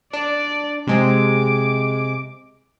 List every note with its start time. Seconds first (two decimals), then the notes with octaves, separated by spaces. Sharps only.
0.13 D4 D5
0.87 C3 G#3 C4 D6